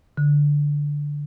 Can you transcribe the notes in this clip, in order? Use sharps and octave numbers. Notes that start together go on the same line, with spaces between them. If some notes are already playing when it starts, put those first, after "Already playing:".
D3